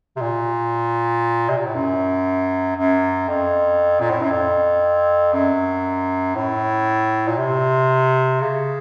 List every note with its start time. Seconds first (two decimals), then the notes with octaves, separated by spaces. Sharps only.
0.16 C3
0.21 A#2
1.49 C3
1.57 A#2
1.66 A2
1.75 F#2
2.76 F#2
3.28 F2
4.00 A#2
4.10 A2
4.21 F#2
4.30 F2
5.33 F#2
6.35 A2
7.28 A#2
7.38 C3
8.41 C#3